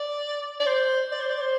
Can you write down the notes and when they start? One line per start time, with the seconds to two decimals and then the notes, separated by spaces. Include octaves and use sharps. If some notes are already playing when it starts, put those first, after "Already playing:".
Already playing: D5
0.60 D5
0.66 C5
1.12 D5
1.20 C5
1.29 D5
1.41 C5